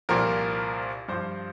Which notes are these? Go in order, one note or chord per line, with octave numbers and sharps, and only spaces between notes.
C2 A#2 F3 A#4
G2 F3 C5